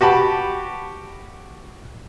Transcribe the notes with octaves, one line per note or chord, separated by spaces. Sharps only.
F#4 G4 A5 B5